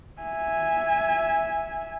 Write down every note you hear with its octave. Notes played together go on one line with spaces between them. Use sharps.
E5 G#5